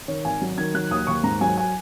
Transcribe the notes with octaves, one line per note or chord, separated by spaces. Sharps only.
D#3 C#5
G#1 G#5
F#3
D#3 G#6
F#3 F#6
D#2 D#6
D#2 C#6
G#2 A#5
F#3 G#5
G#5